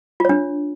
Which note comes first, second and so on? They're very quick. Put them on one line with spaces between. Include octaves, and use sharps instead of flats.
F4 C#5 D4